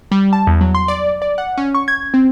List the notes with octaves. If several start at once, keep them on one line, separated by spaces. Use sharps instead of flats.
G3
A5
E2
F#3
C6
D5
D5
F#5
C#4
C#6
G#6
C4